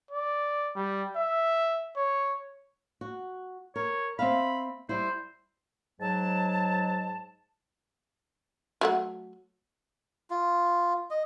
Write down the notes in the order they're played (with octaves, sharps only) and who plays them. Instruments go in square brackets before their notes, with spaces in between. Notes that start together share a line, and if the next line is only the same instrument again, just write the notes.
[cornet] D5
G3
E5
C#5
[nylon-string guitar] F#4
[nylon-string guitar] A#4 [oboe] C#5
[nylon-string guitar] C4 E5 F5 [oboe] B5
[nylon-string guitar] G3 E4 [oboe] C5
[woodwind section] G#2 F#3 A5
[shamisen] F#3 A3 F#5
[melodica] F4
D#5